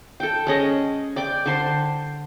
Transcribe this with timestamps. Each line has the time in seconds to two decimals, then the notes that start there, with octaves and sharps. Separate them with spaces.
0.20 A4 G5
0.47 G#3 C#4 D#5
1.16 D5 G5 D6
1.45 D3 C5 C6